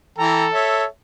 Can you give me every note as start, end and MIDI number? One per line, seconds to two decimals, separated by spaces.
0.18 0.47 52
0.18 0.86 69
0.18 0.47 79
0.18 0.47 82
0.53 0.85 73
0.53 0.85 76